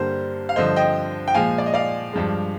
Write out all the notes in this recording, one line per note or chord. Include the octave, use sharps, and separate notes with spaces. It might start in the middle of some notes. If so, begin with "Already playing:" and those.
Already playing: G2 D3 G3 A#3 C5
F5
G2 D3 F3 C5 D#5
D#5 G5
G5
A#2 F3 G#3 F5 G#5
D5
D#5
D5 F5
G2 F3 G#3